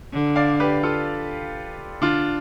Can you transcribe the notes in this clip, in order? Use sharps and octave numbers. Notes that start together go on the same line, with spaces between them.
D3
D5 F5
G4 B4
F4 A4
D3 D4 F4